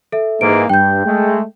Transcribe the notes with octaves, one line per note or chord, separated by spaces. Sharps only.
A4 E5
G#2 E3 A#3 D7
G2 G5 G6
G#3 A3